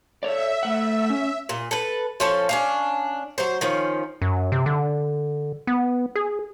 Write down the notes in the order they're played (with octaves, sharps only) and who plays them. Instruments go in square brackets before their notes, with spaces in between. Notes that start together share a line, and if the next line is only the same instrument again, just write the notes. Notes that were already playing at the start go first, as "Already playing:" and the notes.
[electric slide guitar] A4 C#5 D5 [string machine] E5
[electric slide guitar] A3 F#5
C#4
[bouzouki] A#2
A4 B4
F3 C#4 A4 A5
C#4 D4 F5
F#3 C5
D#3 F3 C#4
[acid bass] F#2
C3
D3
B3
G#4